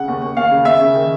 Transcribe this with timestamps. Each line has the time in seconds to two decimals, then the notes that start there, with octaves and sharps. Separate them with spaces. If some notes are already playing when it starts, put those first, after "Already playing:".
Already playing: C#3 F#5
0.08 D#2
0.22 D#2
0.37 D#2 F5
0.51 C#3
0.65 D#2 E5
0.81 C#3
0.95 D#3